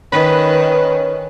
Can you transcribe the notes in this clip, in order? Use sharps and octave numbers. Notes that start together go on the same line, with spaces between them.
D#3 C#4 B4